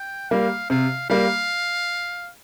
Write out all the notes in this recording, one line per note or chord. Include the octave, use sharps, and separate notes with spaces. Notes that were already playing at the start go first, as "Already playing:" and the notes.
Already playing: G5
G3 A#3 F5
C3 F5
G3 A#3 F5